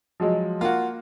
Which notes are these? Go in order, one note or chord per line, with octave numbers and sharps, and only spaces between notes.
F3 F#3 G#3
A#3 F4 F#4